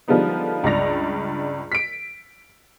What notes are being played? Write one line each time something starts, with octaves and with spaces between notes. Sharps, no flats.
D3 F3 G3 G#3 B3 D#4
C#2 G2 D5 A#6 F7
B6 D7